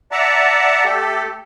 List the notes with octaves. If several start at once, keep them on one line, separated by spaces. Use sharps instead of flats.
D5 E5 F#5 A5 A#5
A3 G4 A4